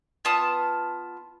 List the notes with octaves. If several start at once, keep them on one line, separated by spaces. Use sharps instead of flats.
B3 F4 A5 D#6